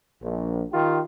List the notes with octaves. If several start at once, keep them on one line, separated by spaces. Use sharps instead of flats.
A#1
D#3 F4 G4